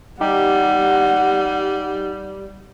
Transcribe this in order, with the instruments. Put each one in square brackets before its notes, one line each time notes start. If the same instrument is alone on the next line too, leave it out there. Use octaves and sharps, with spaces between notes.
[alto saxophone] G3 [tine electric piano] D#4 G4 [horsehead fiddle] F#5